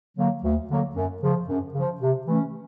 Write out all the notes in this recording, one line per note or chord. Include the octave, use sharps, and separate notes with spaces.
D3 F#3 A#3
D2
D3 F#3 A#3
F#2
C#3 F3
F#2
C#3 F3
C3
E3 A3 C#4